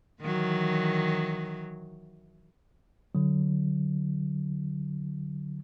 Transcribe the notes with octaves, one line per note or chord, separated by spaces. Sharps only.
D#3 E3 F#3
D3 F#3